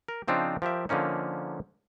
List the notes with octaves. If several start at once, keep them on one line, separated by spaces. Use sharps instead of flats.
A#4
C#3 F3 C4 D4 D#4 F4
F3 G4 A#4 E5
D3 F3 A#3 C#4 D#4